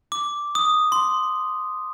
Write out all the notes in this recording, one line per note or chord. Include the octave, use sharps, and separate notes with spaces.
D6
D#6
C6